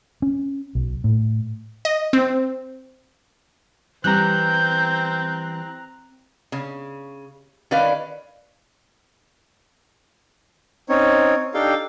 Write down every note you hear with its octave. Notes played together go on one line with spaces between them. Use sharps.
C#4
B1
A2
D#5
C4
E3 G3 C4 A#5 F#6 G6
C#3
D#3 C#4 B4 D5 F5
C4 C#4 D#4 C#5
D4 D#4 G4 A4 F5 G5